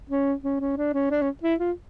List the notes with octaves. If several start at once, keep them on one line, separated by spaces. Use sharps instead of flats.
C#4
C#4
C#4
D4
C#4
D4
C#4
E4
F4